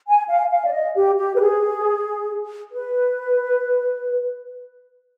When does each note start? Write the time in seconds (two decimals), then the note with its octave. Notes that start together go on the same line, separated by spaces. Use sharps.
0.08 G#5
0.29 F5
0.51 F5
0.66 D5
0.73 D#5
0.95 G4
1.17 G4
1.35 B4
1.40 G#4
2.72 B4